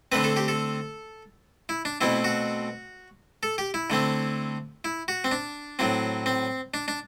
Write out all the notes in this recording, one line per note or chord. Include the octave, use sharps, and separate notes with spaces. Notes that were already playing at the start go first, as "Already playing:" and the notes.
D3 A3 C4 B4
A4
G4
A4
E4
D4
B2 A3 C4 E4
F#4
A4
G4
E4
D3 A3 C4
E4
F#4
C4
D4
A2 F#3 C4
C4
D4
D4